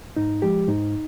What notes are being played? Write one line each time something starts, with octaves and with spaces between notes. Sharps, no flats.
G#2 D#4
F3 G#3 G4
G#2 D#4